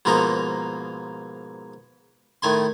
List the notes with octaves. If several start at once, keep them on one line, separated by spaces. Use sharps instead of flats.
G#2 B2 F3 A#3 D#4 A#5
A2 D#3 G#5 C6